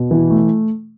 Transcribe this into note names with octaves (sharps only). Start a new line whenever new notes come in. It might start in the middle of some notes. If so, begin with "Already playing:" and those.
Already playing: B2
E3
A3